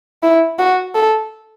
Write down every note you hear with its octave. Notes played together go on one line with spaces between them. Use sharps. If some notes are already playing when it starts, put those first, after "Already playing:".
E4
F#4
A4